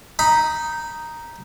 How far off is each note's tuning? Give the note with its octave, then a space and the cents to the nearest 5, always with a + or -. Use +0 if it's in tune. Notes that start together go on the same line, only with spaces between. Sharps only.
D#4 +0 B5 -10